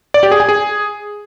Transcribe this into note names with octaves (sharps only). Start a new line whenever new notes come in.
D5
G4
G#4
G#5
G#4